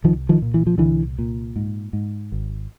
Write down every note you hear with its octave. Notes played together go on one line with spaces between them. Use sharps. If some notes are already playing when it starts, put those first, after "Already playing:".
C2 D#3 F3
D#3 F3
A#2
E3
F3
C2 D3 E3
A#2
G#2
G#2
G#1